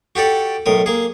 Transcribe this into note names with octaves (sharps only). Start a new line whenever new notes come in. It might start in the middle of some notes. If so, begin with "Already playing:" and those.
F#4 G4 A4 D5
B1 A2 A#4 D#6
A#3 G#4